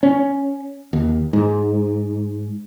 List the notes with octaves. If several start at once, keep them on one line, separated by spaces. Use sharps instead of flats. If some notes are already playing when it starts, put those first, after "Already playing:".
C#4
D#2
G#2